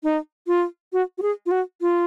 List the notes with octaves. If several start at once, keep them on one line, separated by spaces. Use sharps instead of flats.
D#4
F4
F#4
F#4
G#4
F4
F#4
F4